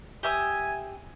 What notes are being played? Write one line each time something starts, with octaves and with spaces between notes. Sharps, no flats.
G4 E5 G#5 D#6